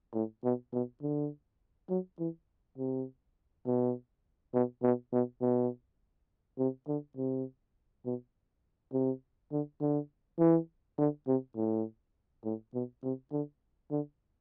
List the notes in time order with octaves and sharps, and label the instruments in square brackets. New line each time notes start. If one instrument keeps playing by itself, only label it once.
[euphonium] A2
B2
B2
D3
F#3
E3
C3
B2
B2
B2
B2
B2
C3
D3
C3
B2
C3
D3
D3
E3
D3
C3
A2
A2
B2
C3
D3
D3